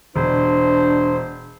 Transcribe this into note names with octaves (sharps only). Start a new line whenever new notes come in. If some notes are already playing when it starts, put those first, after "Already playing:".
E1 D4 C5